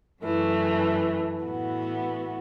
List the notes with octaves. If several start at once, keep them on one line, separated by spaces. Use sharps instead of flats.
F#2 E3 A3
A2 E3 B3 F#4